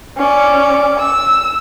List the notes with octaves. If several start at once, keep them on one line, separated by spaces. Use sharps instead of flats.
C#4 D5
E6